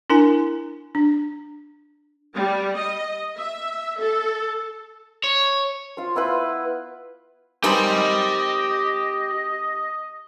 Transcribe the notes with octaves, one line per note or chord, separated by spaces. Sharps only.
D4 E4 A#4 G#5
D4
G3
D#5
E5
A4
C#5
F4 C5
B3 E4 F4 B4
D#3 G#3 C4 G4 D#5 B5